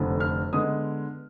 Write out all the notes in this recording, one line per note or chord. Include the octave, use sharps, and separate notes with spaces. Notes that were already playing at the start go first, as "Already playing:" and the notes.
Already playing: F1 F2 D3
F6
D3 G#3 B3 D#6